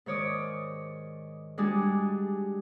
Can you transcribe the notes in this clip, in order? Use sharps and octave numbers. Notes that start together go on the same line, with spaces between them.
G#2 D#3 C#5 D5 D#6
G3 G#3 D4 F#4 G#4